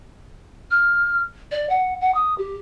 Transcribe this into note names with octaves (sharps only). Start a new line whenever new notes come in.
F6
D5
F#5
F#5
D#6
G4